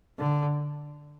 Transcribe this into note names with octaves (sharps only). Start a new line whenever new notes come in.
D3